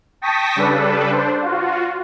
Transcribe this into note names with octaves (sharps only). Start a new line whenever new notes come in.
G5 A5 C#6 D#6 A#6 B6
C#3 G3 D4 A4 B4
D4 C5
F4 F#4